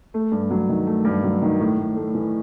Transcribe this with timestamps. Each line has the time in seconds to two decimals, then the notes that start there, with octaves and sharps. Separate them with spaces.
0.14 A3
0.32 G2
0.51 F#3
0.69 D#3
0.87 A3
1.05 G2
1.24 F#3
1.42 D#3
1.60 A2
1.78 A2
1.96 A3
2.14 E3